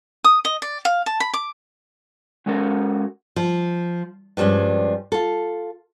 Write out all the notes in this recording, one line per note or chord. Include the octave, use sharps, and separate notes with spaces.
D#6
D#5
D5
F5
A5
B5
D6
G#3 C#4 F#4 A4 A#4
F3
G2 F3 G3 G#3 C#4
F4 A4